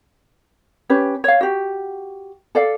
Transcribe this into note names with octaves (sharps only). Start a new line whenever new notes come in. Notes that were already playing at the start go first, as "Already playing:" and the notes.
C#4 G4 B4 C#5
C#5 F5
F#4 G4
A4 D5 F5